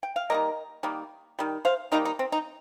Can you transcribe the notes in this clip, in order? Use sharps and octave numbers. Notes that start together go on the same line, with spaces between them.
G5
F5
D#3 G3 A#3 A#4 D#5
D#3 G3 A#3
D#3 G3
C5 F5
D#3 G3 A#3 D#4
D#4
C4
D#4